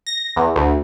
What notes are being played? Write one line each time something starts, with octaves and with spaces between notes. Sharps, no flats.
A#6
E2
D2